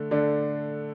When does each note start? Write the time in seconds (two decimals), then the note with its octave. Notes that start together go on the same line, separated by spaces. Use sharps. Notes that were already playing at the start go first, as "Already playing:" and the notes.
Already playing: D3 A3
0.11 D3 A3 D4